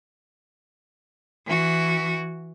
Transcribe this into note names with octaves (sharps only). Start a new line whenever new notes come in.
E3 F#4